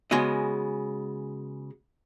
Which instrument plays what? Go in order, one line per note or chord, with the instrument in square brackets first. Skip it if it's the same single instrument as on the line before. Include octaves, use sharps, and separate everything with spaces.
[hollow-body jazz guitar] C#3 G#3 B3 F#4 D#5